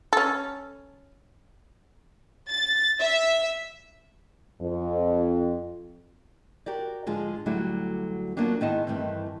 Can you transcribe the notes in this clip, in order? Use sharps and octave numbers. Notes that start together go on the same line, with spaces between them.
C#4 A4
A6
E5
F2
F#4 G4 A#4 D5
G#2 D3 F3 G#3 F4
D2 D3 F#3 G3 A3 E4
F3 F#3 A#3 B3 D4
G#2 D#3 B3 E4 D#5 A5
G2 D#3 E3 A3 C4